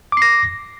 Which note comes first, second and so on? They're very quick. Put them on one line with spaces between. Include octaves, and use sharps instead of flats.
D6 C7 A#6